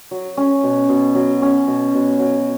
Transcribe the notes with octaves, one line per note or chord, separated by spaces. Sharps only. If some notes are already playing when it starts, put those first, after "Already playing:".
F#3
C#4
B2
B2
F#3
C#4
B2
B2
F#3